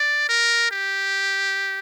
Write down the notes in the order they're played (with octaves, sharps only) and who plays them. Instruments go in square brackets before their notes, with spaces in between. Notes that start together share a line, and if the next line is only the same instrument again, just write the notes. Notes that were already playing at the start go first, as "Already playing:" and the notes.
Already playing: [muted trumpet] D5
A#4
G4